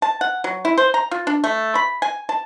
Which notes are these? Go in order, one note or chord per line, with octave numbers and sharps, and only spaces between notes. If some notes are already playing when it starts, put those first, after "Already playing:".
A5
F#5
F#3
E4
C5
A#5
F4
D4
A3
B5
G#5
A5